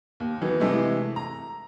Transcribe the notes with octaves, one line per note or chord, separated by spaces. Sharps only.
D#2
D#3 E3 F#3 B3
C3 E3 G#3 A3 E4
A#5